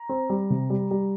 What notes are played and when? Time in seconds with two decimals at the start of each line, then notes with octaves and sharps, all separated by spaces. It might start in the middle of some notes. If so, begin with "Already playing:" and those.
Already playing: A#5
0.09 C4
0.30 G3
0.50 C3
0.70 G3
0.91 G3